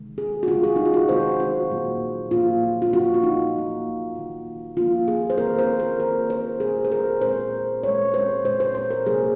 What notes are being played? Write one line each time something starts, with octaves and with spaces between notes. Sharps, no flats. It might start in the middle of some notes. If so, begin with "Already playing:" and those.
Already playing: C3 D#3 G#3
G#4
F#4
C3 D#3 G#3 F4
G#4
D#4
F4
F#4
C3 D#3 G#3 C5
F#4
A#2 F#3 A#3
A#2 F#3 A#3 F4
F4
A#2 F#3 A#3 F#4
F4
D#4
A#2 F#3 A#3
D#3 A#3
D#3 A#3 F4
G#4
C5
D#3 A#3 A#4
C5
A#4
D#3 A#3 A#4
C5
A#2 G#3 G#4
C5
A#4
A#2 G#3 C5
A#2 G#3 C#5
C5
A#2 G#3 C5
C5
C5
A#4
C3 F#3 A#3 G#4